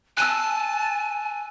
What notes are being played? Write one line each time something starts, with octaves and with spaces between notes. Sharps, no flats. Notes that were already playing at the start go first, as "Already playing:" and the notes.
G#5 A5 E6 F#6